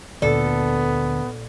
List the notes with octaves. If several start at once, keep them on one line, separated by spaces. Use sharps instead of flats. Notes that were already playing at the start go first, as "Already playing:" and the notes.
D2 A#2 D3 B3 A4 D5